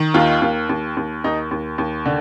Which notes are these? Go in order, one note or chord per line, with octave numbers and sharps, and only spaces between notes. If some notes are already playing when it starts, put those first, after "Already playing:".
Already playing: D#3
D#2 F4
D#2
D#2
D#2
D#2 D#4
D#2
D#2
D3